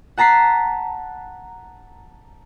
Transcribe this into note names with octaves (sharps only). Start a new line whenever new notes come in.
F#5 A5 A#5 B6 C7